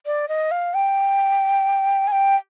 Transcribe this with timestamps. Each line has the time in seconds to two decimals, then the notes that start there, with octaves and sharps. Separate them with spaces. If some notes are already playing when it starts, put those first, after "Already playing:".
0.06 D5
0.28 D#5
0.51 F5
0.74 G5
2.07 G#5
2.12 G5